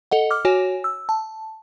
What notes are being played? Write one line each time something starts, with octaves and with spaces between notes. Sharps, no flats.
A4 D#5 F#5
D6 F6
F#4 C#5 G#5
E6
A5